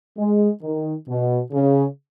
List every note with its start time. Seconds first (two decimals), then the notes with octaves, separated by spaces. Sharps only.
0.17 G#3
0.62 D#3
1.08 B2
1.52 C#3